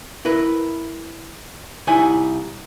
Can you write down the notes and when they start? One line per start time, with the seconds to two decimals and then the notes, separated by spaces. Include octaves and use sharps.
0.25 E4 A#4 B4
1.87 C2 D#4 E4 G#5